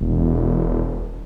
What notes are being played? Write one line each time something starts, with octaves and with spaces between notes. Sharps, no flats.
E1